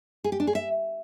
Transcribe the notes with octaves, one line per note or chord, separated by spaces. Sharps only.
G#4
G4
D4
G#4
E5